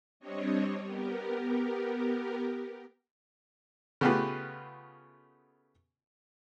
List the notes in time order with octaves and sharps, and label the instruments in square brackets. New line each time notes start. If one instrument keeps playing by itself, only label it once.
[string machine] G3 C4 D4 C#5 D#5
B3 G4 A#4
[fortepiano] C#3 A3 B3 F4 G4 B4